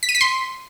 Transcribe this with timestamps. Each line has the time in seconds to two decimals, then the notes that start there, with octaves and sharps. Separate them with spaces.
0.03 B6
0.09 D#7
0.15 B6
0.21 C6